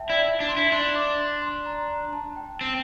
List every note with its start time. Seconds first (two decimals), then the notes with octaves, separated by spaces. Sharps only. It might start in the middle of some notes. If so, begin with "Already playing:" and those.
Already playing: E5 G5 A5
0.09 E4 D5
0.24 E5
0.40 D4
0.49 C6
0.57 E4
0.72 D4 C6
0.96 D6
1.19 C6
1.42 C6
1.66 A#5
2.13 A5
2.36 G5
2.61 C4